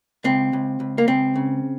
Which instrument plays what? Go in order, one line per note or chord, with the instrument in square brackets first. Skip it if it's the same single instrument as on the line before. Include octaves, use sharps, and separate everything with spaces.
[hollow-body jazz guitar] C#2 C4
C#2
C#2
A#3
C#2 C4
C#3